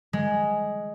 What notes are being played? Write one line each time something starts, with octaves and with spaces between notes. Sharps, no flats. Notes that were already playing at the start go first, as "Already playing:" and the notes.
G#3